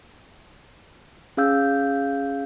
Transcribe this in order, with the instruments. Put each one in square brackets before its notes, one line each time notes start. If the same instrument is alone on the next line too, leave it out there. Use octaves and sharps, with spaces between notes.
[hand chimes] C#4 G#4 F5 E6 G6